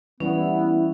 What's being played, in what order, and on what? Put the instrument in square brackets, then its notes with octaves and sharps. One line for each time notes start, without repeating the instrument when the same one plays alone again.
[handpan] E3 G3 [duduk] B3 [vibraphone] C#4 [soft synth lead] E4